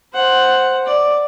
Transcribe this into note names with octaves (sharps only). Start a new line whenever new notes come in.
C5 F#5
D5